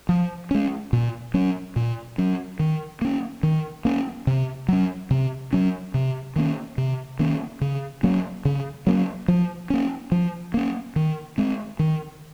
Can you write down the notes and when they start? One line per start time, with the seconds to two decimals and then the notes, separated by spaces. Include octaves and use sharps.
0.09 F3
0.51 G#3 C#4
0.93 A#2
1.34 F#3 C#4
1.76 A#2
2.18 F#3 C#4
2.59 D#3
3.01 A#3 C#4
3.43 D#3
3.85 A#3 C#4
4.27 C3
4.68 F#3 C#4
5.11 C3
5.53 F#3 C#4
5.94 C3
6.36 D#3 A#3 C#4
6.78 C3
7.19 D#3 A#3 C#4
7.61 C#3
8.03 F#3 A#3 C#4
8.45 C#3
8.87 F#3 A#3 C#4
9.28 F3
9.70 A#3 C#4
10.12 F3
10.54 A#3 C#4
10.96 D#3
11.38 G#3 C4
11.79 D#3